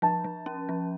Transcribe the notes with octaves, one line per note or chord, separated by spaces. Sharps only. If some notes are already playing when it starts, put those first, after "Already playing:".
F3 A5
F3
C#4
F3